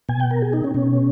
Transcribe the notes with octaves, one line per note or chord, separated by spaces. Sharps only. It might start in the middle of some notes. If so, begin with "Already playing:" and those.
B2 G#5
G5
A#4
G#4
D#4
C#4
B2 C#4